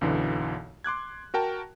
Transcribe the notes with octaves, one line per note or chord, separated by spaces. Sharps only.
B1 F#2 D3 E3
C6 D6 F#6 G#6
F#4 A#4 G5 A5